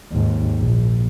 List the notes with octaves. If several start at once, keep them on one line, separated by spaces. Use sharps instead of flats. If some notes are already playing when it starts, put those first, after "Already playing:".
D#2 G#2
A#1